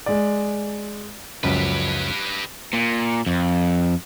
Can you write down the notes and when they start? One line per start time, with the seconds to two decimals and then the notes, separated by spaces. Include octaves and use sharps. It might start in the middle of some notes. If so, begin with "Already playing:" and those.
0.06 G#3 D5
1.44 C#2 F#2 F3 G4 B4
2.73 A#2
3.26 F2